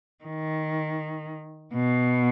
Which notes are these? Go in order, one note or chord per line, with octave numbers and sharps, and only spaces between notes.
D#3
B2